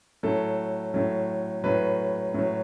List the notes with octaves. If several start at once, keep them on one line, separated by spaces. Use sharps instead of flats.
A2 F#3 A4
A2 F#3
A2 F#3 B4
A2 F#3